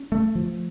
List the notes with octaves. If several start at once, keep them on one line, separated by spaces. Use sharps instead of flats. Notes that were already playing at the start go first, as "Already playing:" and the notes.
Already playing: C#4
A3
F3